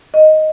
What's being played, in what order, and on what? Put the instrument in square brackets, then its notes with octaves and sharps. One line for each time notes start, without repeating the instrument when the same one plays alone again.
[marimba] D#5